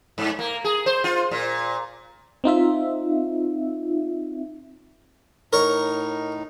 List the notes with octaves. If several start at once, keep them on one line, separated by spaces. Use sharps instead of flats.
G#2
A#3
G#4
C5
F4
A#2
C4 D#4 F4 E5
A2 D#4 A#4 C#5 C#6